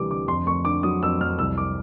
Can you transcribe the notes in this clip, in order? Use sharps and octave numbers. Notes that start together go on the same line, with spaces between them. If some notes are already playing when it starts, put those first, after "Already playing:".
Already playing: D2 C3 E3 G3 D6
D2 D6
F2 C6
F2 C#6
D3 D6
F#3 D#6
F2 E6
F2 F6
C2 E6
D6